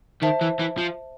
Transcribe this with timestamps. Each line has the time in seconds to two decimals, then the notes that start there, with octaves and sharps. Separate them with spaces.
0.22 D#3 C5 E5 A5
0.42 E3
0.60 E3
0.78 F3